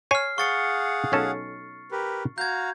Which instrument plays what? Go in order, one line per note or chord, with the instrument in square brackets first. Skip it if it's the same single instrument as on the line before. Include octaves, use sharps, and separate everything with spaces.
[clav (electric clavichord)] C#5 G#5 [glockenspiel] F6 C7
[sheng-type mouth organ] G#4 F5 F#5 [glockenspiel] C#6 A6 C#7
[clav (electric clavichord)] B1 C#4 A4
[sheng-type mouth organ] G4 A#4 B4
[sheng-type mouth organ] F#4 F5 A#5 [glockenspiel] G6 G#6